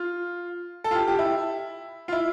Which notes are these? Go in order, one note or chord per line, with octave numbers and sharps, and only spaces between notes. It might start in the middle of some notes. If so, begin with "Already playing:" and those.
Already playing: F4
A4
F4
G4
G4
E4
F4
E4